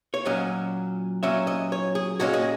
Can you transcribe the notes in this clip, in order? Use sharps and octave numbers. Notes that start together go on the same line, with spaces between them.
C#5
A#2 F#3 C#4 D#5
A#2 F#3 C#4 E5
D#5
C#5
G#4
A#2 G#3 C#4 F#4
G#4